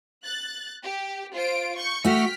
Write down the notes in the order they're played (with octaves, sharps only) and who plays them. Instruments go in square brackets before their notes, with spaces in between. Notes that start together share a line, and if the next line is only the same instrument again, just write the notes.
[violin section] F#6 A6
G4
F4 C5 D7
C#6 G6
[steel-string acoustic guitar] A3 F#4 [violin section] G5 F6 B6